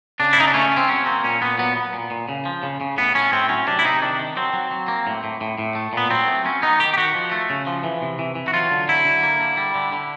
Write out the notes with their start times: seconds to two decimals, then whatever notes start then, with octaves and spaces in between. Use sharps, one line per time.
0.20 C#3 D4
0.33 E4
0.38 C#3 D#4
0.48 D4
0.54 A3 C#4
0.72 A3
0.77 C4
0.89 F#3 C#4
1.06 A#3 C4
1.24 A#2 C#4
1.41 A#2 B3
1.58 F#3 B3
1.77 B3
1.93 A#2
2.11 A#2
2.29 C#3
2.45 F3
2.63 C#3
2.81 C#3
2.97 A2 B3
3.15 A2 C#4
3.32 A2 C4
3.49 F#3 C#4
3.67 C3 D4
3.79 E4
3.84 C3 D#4
4.02 D#3 D4
4.19 D#3
4.36 F#3 C4
4.53 F#3
4.71 F#3
4.88 A#3
5.07 A2
5.24 A2
5.41 A2
5.58 A2
5.75 A3
5.93 A#2 B3
6.10 F#3 C4
6.27 A3
6.44 F#3 C#4
6.62 B3 D#4
6.79 D#3 G4
6.94 G4
6.97 D#3 F#4
7.15 F3
7.32 A3
7.50 C#3
7.67 F3
7.84 E3
8.02 C3
8.19 E3
8.35 E3
8.48 F#4
8.53 F#3 F4
8.71 D3
8.88 F#3 E4
9.05 D3
9.23 A#3
9.40 D3
9.57 G3
9.75 D3
9.93 D3